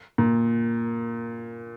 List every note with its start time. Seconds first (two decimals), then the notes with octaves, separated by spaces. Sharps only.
0.18 A#2